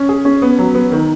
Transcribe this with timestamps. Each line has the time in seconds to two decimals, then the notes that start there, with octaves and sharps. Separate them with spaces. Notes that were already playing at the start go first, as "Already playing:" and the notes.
Already playing: C#4
0.09 G#4
0.25 C#4
0.42 B3
0.59 F#3
0.75 B3
0.92 D#3